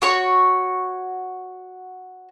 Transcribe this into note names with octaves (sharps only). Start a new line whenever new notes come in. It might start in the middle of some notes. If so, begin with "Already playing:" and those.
F#4 C#5 C#6